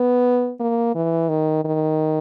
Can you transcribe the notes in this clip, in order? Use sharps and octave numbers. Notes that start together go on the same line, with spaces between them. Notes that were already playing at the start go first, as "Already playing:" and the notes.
Already playing: B3
A#3
E3
D#3
D#3